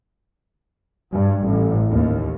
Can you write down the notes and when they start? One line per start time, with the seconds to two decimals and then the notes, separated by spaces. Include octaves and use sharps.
1.12 G2
1.45 A1
1.90 D#2